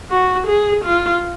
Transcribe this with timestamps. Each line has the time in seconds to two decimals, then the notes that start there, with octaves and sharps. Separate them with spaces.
0.10 F#4
0.47 G#4
0.84 F4